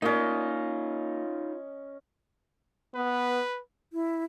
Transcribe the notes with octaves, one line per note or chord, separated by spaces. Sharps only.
A#3 C#4 D#4 F4 D5 D#5
B3 B4
E4